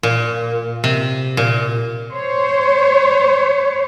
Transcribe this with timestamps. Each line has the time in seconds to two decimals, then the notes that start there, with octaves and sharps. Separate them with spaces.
0.03 A#2
0.84 C3
1.37 A#2
2.13 C5 C#5